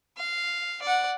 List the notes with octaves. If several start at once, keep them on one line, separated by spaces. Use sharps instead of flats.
F5
D5 F#5